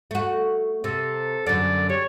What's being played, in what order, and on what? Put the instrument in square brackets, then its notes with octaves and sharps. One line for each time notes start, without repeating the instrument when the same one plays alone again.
[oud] A3 F#4
[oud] C3 [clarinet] A4
[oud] F#2 D3 [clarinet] D5
[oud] G4 [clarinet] C#5